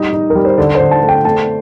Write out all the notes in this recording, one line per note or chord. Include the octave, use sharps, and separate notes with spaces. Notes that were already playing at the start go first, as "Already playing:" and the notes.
Already playing: G3 D#4 D#5
D#4
A#4
G3
C5
D3 D5
C5
D3
A5
A3
G5
A3 A5